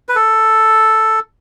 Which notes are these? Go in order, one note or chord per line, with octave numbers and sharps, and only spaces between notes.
B4
A4